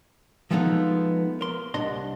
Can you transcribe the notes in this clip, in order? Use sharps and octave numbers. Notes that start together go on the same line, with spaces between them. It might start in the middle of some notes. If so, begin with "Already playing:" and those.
F3 G#3 A3 B3 C4 D#4
A#4 C6
C2 D4 D#5 C6